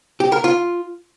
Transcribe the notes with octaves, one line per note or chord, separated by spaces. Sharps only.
G4
A#4
F4